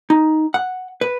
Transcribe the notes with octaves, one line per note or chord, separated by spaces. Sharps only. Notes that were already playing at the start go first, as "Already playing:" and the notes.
D#4
F#5
B4